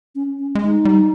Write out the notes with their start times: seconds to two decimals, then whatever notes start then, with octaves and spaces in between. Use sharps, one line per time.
0.15 C#4
0.39 C#4
0.55 G#3
0.62 D#4
0.85 G3